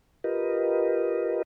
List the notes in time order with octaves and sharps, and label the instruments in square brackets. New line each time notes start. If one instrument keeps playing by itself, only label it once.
[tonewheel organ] F4 G4 A#4 B4 D#5